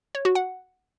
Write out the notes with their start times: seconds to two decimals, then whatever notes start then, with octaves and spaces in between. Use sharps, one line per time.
0.15 C#5
0.25 F#4
0.35 F#5